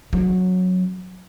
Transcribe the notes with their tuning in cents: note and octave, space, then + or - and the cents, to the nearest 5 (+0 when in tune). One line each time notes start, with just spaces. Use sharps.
F#3 -10 C#4 -40